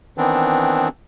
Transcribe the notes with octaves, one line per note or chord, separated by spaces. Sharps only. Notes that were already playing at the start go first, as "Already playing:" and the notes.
D#3 E3 B3 C4 D4